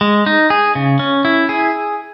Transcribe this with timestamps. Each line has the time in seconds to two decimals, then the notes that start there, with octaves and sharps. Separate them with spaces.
0.01 G#3
0.26 D#4
0.50 G#4
0.75 C#3
0.99 C#4
1.25 E4
1.49 G#4